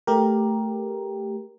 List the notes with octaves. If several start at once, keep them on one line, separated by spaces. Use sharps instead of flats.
A3 G4 A#4